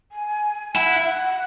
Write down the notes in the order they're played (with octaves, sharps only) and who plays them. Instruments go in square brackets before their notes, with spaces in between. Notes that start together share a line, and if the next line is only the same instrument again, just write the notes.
[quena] G#5
[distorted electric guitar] E4 [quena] F#5
[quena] F#5
E5
F#5